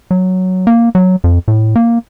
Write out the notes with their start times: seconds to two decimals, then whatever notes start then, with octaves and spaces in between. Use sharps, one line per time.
0.11 F#3
0.67 A#3
0.95 F#3
1.24 F2
1.48 A2
1.76 A#3